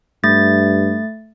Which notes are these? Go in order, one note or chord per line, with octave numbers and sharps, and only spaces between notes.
G2 A3 A6